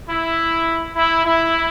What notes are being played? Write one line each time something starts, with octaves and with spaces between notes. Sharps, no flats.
E4
E4
E4